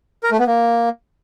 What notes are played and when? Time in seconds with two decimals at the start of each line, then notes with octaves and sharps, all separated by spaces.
0.23 A#4
0.31 A3
0.39 B3
0.47 A#3